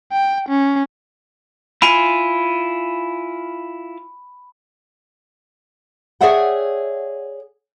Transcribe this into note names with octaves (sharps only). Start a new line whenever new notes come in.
G5
C#4
E4 F4 G#5 B5
G#4 C#5 D5 E5 F#5 G5